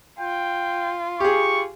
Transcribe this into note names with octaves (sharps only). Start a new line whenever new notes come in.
F4 G5
G4 G#4 C#6